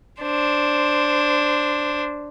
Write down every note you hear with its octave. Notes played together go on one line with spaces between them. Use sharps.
D4 C5